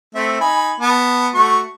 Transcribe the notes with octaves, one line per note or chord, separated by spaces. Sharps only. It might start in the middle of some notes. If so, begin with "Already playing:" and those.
A3 C4 E5
D#4 G#5 B5
B3 A5
A3 F#4 C#6